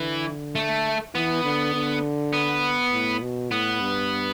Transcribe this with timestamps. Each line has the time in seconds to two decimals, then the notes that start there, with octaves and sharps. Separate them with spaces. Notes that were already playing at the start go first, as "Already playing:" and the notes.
Already playing: D3 E3
0.55 A3
1.14 E3 B3
1.44 D3
1.74 D3
2.33 B3
2.92 A2
3.21 B2
3.51 A2 B3
3.81 G2